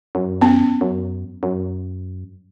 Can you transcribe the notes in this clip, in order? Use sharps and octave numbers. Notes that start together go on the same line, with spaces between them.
F#2
B3 C#4
F#2
F#2